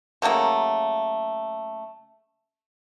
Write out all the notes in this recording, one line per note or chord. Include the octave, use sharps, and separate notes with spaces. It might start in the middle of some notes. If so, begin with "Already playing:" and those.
C#3 F#3 A3 A#3